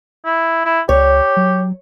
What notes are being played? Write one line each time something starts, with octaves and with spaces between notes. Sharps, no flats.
E4
E4
C#2 G4 C#5
F#3